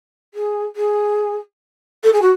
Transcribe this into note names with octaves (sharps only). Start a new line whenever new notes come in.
G#4
G#4
A4
G#4
F#4